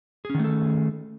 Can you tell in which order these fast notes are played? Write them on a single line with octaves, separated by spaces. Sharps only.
G#4 C#4 D#3 A3 A4